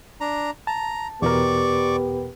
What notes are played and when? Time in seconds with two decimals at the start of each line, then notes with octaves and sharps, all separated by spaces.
0.21 D4 A#5
0.67 A5 A#5
1.22 E2 B2 B3 G4 A#4 D5 C#6 D6